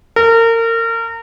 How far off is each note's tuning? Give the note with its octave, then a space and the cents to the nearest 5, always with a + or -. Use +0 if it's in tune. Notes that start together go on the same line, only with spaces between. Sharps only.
A#4 -30